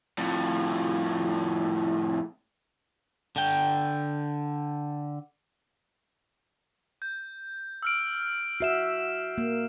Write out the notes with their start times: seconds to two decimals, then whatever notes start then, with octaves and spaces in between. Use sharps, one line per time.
0.18 F2 A2
3.36 D3 G5
7.02 G6
7.83 E6 F6 D7
8.60 F#4 E5 C7 D7 E7
9.38 A#3